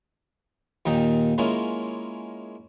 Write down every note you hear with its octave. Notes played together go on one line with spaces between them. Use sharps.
D#2 A#2 D#3 D#4 G5
G#3 A#3 C#4 E4 F4